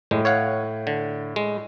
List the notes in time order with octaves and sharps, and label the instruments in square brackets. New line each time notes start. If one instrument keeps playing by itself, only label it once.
[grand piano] A2 [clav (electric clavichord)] G#3
[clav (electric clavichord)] C#5 F5 F#5
D3
G#3